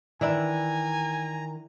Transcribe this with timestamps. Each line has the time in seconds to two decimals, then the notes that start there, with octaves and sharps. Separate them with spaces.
0.21 D#3 E3 D4 E4 G#5 A#5